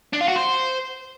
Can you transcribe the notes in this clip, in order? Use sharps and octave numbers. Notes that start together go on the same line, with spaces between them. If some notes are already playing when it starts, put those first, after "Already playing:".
D4
F4
F#4
C5